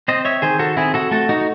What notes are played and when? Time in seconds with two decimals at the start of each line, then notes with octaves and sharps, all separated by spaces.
0.08 C4 C5 D#5
0.25 C#5 E5
0.42 D#3 G#4 C5
0.59 F#4 A4
0.77 C4 E4 G#4
0.94 F#4 A4
1.11 A3 F#4 A4
1.29 D#4 F#4